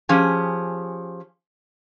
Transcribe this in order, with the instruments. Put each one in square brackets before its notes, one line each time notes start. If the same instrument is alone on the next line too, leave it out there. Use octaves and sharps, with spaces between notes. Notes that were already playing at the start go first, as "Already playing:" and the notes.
[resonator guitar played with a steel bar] F3 C#4 G4 G#4